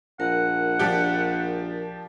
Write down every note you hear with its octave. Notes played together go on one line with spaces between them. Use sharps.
A#1 A#4 F#5
F3 D4 G4